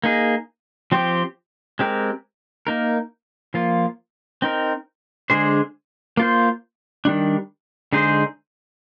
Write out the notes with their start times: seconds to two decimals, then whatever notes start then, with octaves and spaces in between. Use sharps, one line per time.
0.04 A#3 D#4 G#4
0.92 F3 C4 G4
1.79 G#3 C4 G4 A#4
2.67 A#3 D#4 A#4
3.54 F3 A#3 F4
4.42 C4 D#4 A#4
5.30 D3 G#3 D4 G#4 C5
6.17 A#3 F4 C5
7.05 D#3 G3 D4
7.93 D3 G#3 D#4 G#4 C5